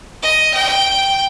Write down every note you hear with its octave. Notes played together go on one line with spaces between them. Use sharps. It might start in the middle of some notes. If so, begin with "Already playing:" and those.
D#5
G5